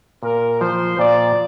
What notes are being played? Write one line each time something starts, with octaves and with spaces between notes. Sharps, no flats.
A#2 A#4
F3 C5
A#2 D5